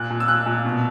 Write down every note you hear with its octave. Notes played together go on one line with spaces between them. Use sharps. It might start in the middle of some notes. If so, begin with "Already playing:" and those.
Already playing: A#2 F#6
A#2
E6
A#2 F#6
A#2
B2